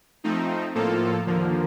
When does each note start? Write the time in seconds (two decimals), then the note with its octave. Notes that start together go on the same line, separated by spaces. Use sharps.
0.24 F3 A3 C4 D#4
0.75 A2 F3 A#3 F4 A4
1.26 D#2 D3 F3 A#3